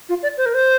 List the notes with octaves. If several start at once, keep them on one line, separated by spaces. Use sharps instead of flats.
F4
D5
C5
A#4
C5